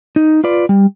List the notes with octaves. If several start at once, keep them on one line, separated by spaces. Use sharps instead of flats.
D#4
F4 B4 D5
G3